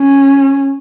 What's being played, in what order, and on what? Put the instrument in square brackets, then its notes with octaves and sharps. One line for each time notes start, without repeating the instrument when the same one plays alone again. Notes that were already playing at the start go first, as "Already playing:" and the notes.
Already playing: [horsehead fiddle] C#4